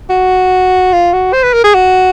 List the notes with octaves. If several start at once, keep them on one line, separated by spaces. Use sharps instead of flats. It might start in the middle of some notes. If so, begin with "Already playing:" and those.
F#4
F4
F#4
C5
B4
A#4
G#4
F#4